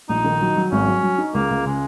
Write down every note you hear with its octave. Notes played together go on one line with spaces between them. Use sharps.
A#1 D#4
D#3
F#3
F#3
G#1 C#4
F#3
F#3
D#4
C#2 A#3
C#2
C#3 G#3